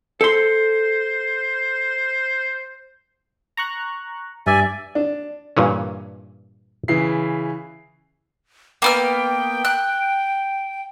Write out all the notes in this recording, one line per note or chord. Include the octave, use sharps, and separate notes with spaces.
A4 C5 C6
A#5 C#6 F#6
G2 D5 E5 G#5
D4
G2 A#2 E3 C#4
C#3 E3 E4 C7
A#3 B3 G5 F6
F#6